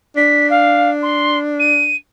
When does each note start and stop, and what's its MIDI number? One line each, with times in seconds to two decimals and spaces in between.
0.17 1.96 62
0.17 0.49 95
0.50 0.90 77
1.02 1.38 84
1.59 1.95 99